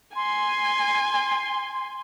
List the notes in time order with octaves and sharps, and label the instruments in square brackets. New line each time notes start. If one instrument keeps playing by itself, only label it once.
[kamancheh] G#5 [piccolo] C6